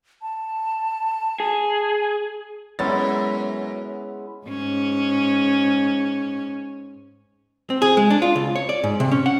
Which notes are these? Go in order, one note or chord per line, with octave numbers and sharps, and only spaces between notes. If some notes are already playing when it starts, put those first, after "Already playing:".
A5
G#4
F#2 G#3 B3 C#4 E4 A6
G#2 C#4
C4
G#4
G#3
D4
F4
C#2
C#5
D5
G#2
C3
C#4
F#5